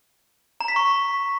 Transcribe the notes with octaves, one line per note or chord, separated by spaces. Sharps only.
A#5
B6
C#6